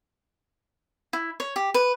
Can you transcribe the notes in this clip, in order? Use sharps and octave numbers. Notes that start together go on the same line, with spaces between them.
E4
C#5
G4
B4